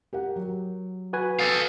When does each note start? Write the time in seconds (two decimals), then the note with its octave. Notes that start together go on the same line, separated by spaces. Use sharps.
0.13 G4 A#4 F#5
0.36 F#3
1.13 F#4 B4 G#5
1.40 A4 F5 D#6 E6